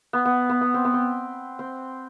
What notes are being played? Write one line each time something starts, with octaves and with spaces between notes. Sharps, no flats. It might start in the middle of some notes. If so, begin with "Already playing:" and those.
B3
B3
B3
B3
C4
B3
C4
C4